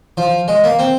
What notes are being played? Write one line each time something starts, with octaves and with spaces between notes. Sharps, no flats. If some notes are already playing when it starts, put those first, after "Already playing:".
F3
G#3
A#3
C4